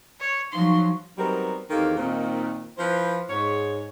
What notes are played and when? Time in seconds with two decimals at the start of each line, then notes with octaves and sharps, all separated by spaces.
0.20 C#5
0.53 F3 F#3 D#4 F5 C6 C#6
1.17 F#3 G3 B3 C4 D#4 A#4
1.70 E2 D#3 A#3 C4 G4 A4
1.96 A#2 D#3 C4
2.77 F3 E4 B4 C5
3.30 G#2 C#5